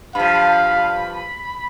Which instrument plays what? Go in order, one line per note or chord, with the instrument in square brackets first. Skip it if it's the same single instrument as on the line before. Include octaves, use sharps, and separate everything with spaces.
[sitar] G2 F3 [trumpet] F5 [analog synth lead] B5